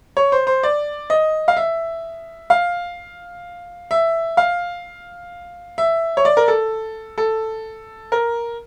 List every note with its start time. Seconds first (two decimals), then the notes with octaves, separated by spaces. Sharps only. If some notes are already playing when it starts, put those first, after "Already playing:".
0.17 C#5
0.32 C5
0.47 C5
0.63 D5
1.10 D#5
1.48 F5
1.57 E5
2.50 F5
3.91 E5
4.37 F5
5.78 E5
6.17 C#5
6.25 D5
6.37 A#4
6.48 A4
7.18 A4
8.12 A#4